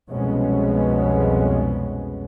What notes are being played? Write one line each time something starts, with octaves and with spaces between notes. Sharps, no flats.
C2 F2 B2 G#3 B3 C#4